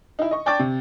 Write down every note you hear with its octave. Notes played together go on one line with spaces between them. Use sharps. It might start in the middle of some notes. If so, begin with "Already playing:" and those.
D#4 E4
D#5 C#6
D5 G5 A5 C#6 D6 A6
C3